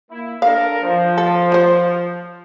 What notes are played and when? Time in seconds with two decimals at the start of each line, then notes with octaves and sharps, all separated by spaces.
0.11 A#3 E4
0.42 D4 A4 A#4 F5
0.83 F3
1.18 A4
1.52 F4 C5